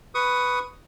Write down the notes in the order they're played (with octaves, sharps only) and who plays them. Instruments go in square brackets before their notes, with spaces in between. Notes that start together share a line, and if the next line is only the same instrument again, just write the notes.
[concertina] B4 C#6 D#6